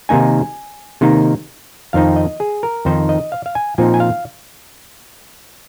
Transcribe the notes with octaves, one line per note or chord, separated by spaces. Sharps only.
C3 D#3 A#3 D#4 G#5
C3 D#3 A#3 D#4
F2 D#3 C4 D#4 F5
D#5
G#4
A#4
F2 D#3 C4 D#4 C5
D#5
F5
F5
G#5
A#2 F3 C4 D#4 G#5
G#5
F5